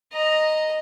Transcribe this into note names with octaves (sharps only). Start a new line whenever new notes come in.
D#5 A#5